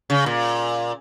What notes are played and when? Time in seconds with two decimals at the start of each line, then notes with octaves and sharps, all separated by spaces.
0.10 C#3
0.26 A#2